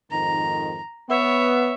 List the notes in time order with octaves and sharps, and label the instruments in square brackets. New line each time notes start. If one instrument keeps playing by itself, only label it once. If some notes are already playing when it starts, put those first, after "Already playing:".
[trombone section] F2 G#2 D#3 [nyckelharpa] A#5
[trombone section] B3 [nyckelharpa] C#5 [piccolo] E5